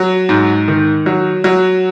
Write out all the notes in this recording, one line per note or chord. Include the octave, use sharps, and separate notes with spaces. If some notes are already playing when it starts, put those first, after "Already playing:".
Already playing: F#3
G#2
D#3
F#3
F#3